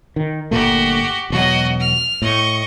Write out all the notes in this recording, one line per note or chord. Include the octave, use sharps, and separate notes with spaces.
D#3
G1 A#2 A3 F#4 G4
E1 B2 F#3 F#4 D#5
F6
A2 D#5 C#6